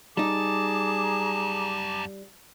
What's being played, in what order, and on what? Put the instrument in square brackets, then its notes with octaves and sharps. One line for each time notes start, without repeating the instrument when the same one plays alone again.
[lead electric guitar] F#2 A5 [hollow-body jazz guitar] G3 D#4 [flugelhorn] G#4 [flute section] A#5 D6